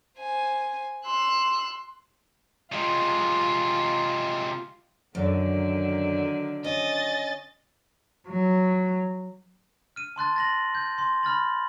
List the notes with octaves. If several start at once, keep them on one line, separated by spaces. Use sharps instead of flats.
C5 G#5
C6 E6 F#6
C3 G#3 F4
F#2 D3 D#3 F#3
C#4 D#5 A6
F#3
F6 D#7
A5 C6 F#6 A6
A6 A#6 F#7
G6
C6
B5 F6 A6 F#7